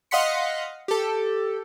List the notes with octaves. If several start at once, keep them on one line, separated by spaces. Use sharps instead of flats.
D#5 F5 F#5 C6 B6 C#7
G4 A4